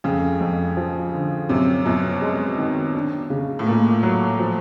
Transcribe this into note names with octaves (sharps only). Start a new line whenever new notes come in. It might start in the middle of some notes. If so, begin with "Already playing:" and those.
F2 C#3
F2
F3
D3
F#2 C3
F#2 B2
G#3
D#3
D4
C#3
A2
A#2 A#3
F#3
F3